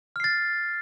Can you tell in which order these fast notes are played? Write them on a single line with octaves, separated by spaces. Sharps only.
F6 C7 A6